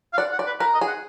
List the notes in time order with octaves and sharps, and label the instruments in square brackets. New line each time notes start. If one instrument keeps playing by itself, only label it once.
[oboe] F5
[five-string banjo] D5 [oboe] F#5
[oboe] F#5
[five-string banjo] D5
[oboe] B4
[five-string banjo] A#4 [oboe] B4
[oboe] D#5
[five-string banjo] G#4
[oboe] F#5